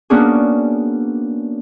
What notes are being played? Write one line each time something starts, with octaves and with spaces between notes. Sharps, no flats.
A#3 B3 C#4 D4 F#4 G#4